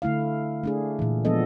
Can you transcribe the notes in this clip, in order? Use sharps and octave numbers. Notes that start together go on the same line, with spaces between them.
D3 A3 E4 F5
A3 D4 G#4
A#2 E3
F3 G#3 B3 D4 A4 D#5